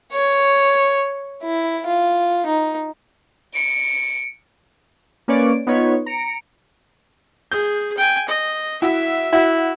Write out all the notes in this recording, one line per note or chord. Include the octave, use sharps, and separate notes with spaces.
C#5
E4
F4
D#4
C#7 D7
A#3 C#4 B4 C#5 D5 D7
B3 D#4 F4 B4 C#5
A#5 C#7 D7
G#4 G6
G5 G#5
D#5
E4 F#4 E5
E4 F#4